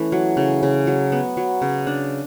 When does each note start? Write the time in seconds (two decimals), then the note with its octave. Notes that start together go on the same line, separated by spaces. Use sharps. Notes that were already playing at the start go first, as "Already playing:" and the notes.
Already playing: E3 A3 C#4
0.12 F#3
0.37 C#3
0.63 C#3
0.87 F#3
1.12 B3
1.37 F#3
1.62 C#3
1.87 D4